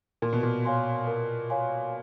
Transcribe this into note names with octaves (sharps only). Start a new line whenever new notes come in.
A#2 A#4
B2
A#2
C#5 F5 G#5 C6
A#4
C#5 F5 G#5 C6